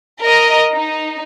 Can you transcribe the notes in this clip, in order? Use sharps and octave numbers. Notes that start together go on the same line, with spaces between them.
A#4 D#5
D#4